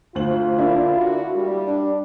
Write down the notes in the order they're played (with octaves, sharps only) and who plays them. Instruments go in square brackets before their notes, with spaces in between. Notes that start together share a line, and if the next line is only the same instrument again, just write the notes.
[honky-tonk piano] D2 C5 F#7 [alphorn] F4
[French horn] D3 [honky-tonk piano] A#3 D4 E4
[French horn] F#4
G3
[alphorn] D4